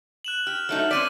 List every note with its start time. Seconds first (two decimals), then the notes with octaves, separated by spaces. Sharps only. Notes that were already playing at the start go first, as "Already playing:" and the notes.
0.24 F#6 E7 F#7
0.47 G4 F6
0.69 F#3 A3 D#4 F6
0.91 C4 C#4 D5 B6 D#7